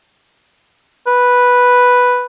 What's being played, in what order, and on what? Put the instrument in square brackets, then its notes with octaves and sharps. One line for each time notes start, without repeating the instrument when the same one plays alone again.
[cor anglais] B4